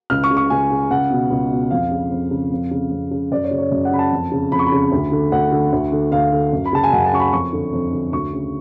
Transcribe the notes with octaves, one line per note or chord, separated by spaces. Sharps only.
C#2 F6
C#6
C#3
C#6
C#2 G#5
C#3
C#2 F#5
B2
C#2
B2
F2 F5
C#3
F2
C#3
F2
C#3
F2
C#3
F#2 D5
C#5
C#3
C#5
F#2
F#5
C#3 B5
A5
F2
C#3
F2 B5
C#6
B5
C#3
D2
D3
D2 F#5
D3
D2
D3
D2 F5
D3
F#2
B5
C#3 A5
G#5
F#2 F#5
A5
C#3 C#6
B5
F2 C#6
D3
F2
D3
D2 C#6
C#3